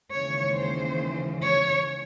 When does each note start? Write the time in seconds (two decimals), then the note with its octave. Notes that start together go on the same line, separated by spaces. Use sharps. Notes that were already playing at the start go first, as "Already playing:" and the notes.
0.12 D#2 C#3 E3 G#3 C#5
0.56 C5
1.43 C#5